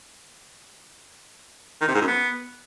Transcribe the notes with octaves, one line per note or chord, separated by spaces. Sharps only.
D#3
C3
G#2
F#2
B3